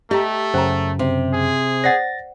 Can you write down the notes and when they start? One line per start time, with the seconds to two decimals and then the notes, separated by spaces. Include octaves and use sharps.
0.11 A3 G4 D#5 A#5
0.54 F#2 C#3 C5 G5 A#5
0.99 C3
1.34 G#4
1.84 C5 D5 F#5 A6 A#6